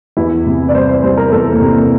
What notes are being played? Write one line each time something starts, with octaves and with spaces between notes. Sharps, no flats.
E2 E4
C3
D5
G3 C5
C5
G3 C5
A#4
E2 A4
A#3
C3